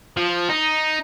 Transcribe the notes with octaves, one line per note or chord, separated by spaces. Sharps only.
F3
D#4